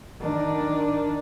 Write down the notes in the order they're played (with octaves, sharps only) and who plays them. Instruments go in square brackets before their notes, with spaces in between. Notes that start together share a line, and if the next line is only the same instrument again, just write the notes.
[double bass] D#3 D4